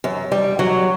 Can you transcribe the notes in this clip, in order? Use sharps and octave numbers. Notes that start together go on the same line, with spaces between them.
F#2
G3
F#3